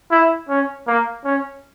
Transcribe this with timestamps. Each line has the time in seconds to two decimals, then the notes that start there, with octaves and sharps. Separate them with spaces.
0.11 E4
0.49 C#4
0.87 A#3
1.25 C#4